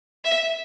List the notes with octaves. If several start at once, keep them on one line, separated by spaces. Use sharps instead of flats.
E5